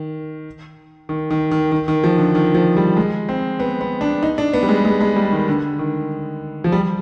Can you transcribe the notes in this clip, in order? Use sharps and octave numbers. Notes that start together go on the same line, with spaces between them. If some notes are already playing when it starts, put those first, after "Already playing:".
Already playing: D#3
D#3
D#3
D#3
D#3
D#3
F3
D3
D#3
F3
G3
G#3
C4
B3
B3
D4
D#4
D4
B3
G3
G#3
G#3
G#3
G3
D#3
D3
D#3
F3
G3